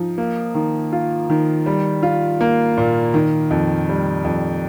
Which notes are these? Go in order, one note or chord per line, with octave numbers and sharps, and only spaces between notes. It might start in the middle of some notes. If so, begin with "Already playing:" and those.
Already playing: F3 D#4
A#3
D#3
F4
D#3
G3
F4
A#3
A#2
D#3
F2
G3
F2